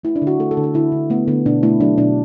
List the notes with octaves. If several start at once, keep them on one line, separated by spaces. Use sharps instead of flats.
A3 E4
D4
D3
F#4
A3 A4
A4
D3
A4
D3 E4
D3
A3 B3
D3 B3
B2 D4
A3 E4
F#3 D4
B2 D4